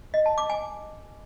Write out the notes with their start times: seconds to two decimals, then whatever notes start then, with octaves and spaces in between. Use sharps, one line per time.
0.14 D#5
0.26 A5
0.38 D6
0.50 G#5